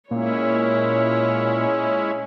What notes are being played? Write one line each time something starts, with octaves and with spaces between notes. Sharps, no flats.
A#2 G#3 C#4 E4 C#5